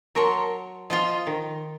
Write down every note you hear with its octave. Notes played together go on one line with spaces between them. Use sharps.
F#3 A#4 C#5 A5 C6
F3 F4 C5 D#5
D#3